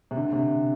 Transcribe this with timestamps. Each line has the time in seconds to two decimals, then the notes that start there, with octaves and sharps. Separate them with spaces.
0.11 C3
0.17 D3
0.33 C3